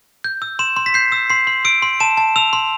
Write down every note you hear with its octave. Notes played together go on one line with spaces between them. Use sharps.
G6
E6
C6 E7
C6
B6
G6 C7
E6
C6 C7
C6
E6 D7
C6
A5 E7
A5
E6 F7
C6